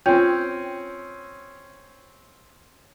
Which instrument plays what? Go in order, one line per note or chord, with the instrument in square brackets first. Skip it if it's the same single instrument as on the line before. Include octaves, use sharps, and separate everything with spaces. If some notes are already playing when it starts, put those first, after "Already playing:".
[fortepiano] C4 C#4 [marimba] F4 G5 G6